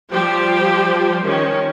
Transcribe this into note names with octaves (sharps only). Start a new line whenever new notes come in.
F3 G3 G4 C5
D#3 C#4